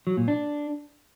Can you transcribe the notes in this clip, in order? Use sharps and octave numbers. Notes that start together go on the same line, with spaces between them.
F#3
A#2
D4